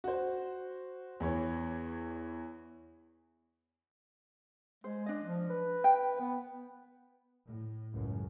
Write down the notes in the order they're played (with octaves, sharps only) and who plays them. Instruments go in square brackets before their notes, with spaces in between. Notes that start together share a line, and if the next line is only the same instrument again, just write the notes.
[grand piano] F#4 C5
E2 E3 C#5
[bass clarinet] G#3 [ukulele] C5
[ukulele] D4 D#5
[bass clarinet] F3
B4
[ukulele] G5
[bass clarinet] B3
[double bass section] A2
C#2 F#2 A2